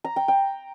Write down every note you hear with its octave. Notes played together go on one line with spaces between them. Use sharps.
A#5
G5
G5